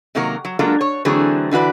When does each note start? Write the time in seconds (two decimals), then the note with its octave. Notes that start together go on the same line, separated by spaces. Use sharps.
0.15 C3 D#3 F#3 A#3 F#4 A#4
0.45 F#3
0.59 F#3 G#3 A#3 D4 F4 A4
0.81 C#5
1.05 D3 E3 F#3 A3 C4 G#4
1.51 D3 E3 F#4 B4 D5